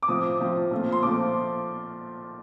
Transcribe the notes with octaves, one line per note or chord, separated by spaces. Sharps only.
D6
A2 F3 C4 F4 D#6
A2 F3 C4 F4
A#2 F3 A3 C4 F4
C6
A#2 F3 A3 C4 F4 D6